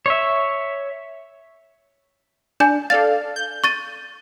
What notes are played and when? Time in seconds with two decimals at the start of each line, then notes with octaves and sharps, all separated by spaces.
0.06 C#5 E5
2.60 D4 G#5 G6 E7
2.90 A4 D5 F5 A6
3.36 G6
3.64 C#6 A6 D#7